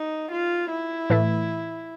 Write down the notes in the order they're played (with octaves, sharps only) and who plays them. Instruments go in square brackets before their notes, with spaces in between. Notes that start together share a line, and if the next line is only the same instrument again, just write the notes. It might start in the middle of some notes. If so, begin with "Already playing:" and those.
Already playing: [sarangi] D#4
F4
E4
[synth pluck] A2 E3 A3